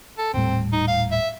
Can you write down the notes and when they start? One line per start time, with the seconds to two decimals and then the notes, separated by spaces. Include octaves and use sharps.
0.18 A4
0.34 D#1 A2 G3 C4
0.73 D#4
0.88 F5
1.12 E5